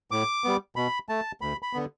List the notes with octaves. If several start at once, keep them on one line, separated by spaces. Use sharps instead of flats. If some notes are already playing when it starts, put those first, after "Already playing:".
A2 D6
G3 B3
B2 B5
A3 A5
D2 B5
B5
D3 B3